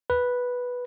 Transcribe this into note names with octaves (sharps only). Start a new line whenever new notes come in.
B4